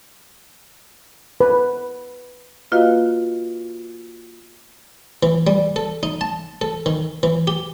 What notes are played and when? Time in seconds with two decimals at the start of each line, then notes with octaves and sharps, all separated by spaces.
1.40 B4
2.72 A#3 F4 F#4 B4 D#5 F5
5.23 E3
5.47 G3
5.76 A4
6.03 D#4
6.21 A5
6.61 A4
6.86 D#3
7.23 E3
7.47 G4